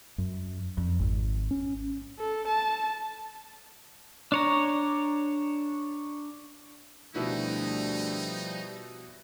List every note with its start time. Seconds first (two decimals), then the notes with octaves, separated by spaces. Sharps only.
0.18 F#2
0.78 F2
0.99 G#1
1.51 C#4
2.19 A4
2.48 A5
4.32 D4 C#5 A#5
7.15 D2 B2 F3 G3 D#4 E4 F#4